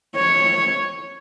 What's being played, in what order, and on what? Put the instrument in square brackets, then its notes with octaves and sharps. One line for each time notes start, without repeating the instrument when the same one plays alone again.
[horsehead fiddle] C#5